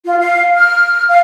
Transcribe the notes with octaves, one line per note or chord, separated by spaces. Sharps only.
F4
F5
F6
F5